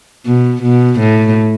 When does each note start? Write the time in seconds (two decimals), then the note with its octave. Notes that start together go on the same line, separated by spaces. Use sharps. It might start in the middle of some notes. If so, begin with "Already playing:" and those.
0.26 B2
0.63 B2
1.00 A2